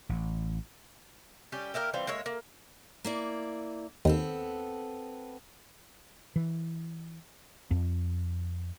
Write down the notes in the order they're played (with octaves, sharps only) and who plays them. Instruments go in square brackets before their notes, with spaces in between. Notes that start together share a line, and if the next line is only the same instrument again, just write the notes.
[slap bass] A1
[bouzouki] G3 C#4 G4
A#3 E4 G4 A#4
E3 G3 C4 F4
G#3 A#3 C#5 E5
A#3
[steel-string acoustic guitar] A#3 E4 D5
[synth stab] D#2 [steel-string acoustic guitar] B3 C4 A4
[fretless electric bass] E3
F2